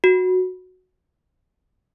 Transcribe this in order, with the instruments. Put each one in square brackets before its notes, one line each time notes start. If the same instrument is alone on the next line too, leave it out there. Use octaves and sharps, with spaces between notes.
[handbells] F#4